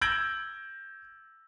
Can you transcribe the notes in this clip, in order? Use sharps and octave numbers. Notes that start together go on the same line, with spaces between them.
E6 G6 G#6 A#6 D7 F#7